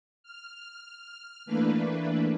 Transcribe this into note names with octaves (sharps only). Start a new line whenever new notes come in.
F6
E3 A3 A#3 D4 B4